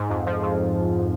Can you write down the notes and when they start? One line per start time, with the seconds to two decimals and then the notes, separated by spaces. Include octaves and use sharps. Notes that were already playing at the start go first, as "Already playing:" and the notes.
Already playing: G#2
0.10 F2
0.26 F3
0.42 F2